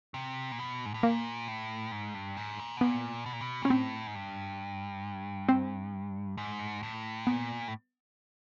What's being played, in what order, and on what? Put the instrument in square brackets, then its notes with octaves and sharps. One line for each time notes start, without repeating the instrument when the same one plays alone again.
[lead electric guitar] C3
A#2
B2
G#2
A2
[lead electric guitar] A#2 [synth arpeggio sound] A#3
[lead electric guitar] A2
G#2
G2
G#2
A#2
B2
[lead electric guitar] A#2 [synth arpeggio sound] B3
[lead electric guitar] B2
A#2
B2
[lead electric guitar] A#2 [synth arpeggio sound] C#4
[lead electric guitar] A2 [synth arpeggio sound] C4
[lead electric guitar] G#2
G2
[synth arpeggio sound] C4
[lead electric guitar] G#2
A2
[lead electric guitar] A#2 [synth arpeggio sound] B3
[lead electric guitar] A2